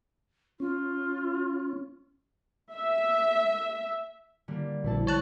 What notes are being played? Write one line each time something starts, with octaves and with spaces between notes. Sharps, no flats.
C#4 F4
E5
D3 G3 A#3
A#1 C3 E4 A5
G#3 C#5 A5 F#6